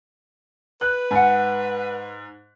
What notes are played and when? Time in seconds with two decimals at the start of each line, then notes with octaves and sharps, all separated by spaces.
0.81 B4 F#6
1.11 G#2 F#5 G#5